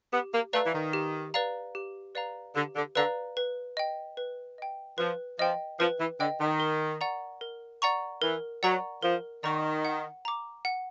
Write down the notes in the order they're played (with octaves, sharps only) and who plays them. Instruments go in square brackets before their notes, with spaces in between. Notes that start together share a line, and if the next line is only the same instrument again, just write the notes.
[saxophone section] B3 [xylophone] G4
[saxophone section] A#3
[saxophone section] A3 [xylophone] B4 D5 F5 A#5
[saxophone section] E3
D#3
[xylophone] G4
B4 D5 F5 A#5
G4
B4 D5 F5 A#5
[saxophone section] D3 [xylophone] G4
[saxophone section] D3
[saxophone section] D3 [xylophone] B4 D5 F5 A#5
[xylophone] B4
D#5 G5
B4
D#5 G5
[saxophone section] F3 [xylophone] B4
[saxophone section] F3 [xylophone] D#5 G5
[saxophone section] F3 [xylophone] B4
[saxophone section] E3
[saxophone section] D3 [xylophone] D#5 G5
[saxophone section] D#3
[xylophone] A#4
D5 F#5 A#5 C#6
A#4
D5 F#5 A#5 C#6
[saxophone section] E3 [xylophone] A#4
[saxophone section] F#3 [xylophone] D5 F#5 A#5 C#6
[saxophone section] F3 [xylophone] A#4
[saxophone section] D#3 [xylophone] D5 F#5 A#5 C#6
[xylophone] F#5
A#5 D6
F#5